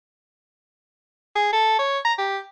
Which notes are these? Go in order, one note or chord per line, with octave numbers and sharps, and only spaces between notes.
G#4
A4
C#5
A#5
G4